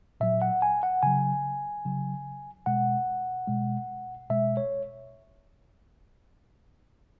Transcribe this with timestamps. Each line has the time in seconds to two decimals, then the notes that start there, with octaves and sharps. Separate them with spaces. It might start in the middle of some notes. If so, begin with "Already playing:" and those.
0.20 A#2 F#3 E5
0.42 F#5
0.62 G#5
0.83 F#5
1.03 C#3 F#3 G#5
1.85 C#3 F#3
2.66 B2 G#3 F#5
3.47 B2 G#3
4.30 B2 G#3 E5
4.57 C#5